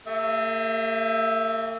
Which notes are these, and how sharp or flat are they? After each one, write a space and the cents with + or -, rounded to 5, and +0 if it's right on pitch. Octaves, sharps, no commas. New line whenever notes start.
A#3 -45 G4 +45 E5 +0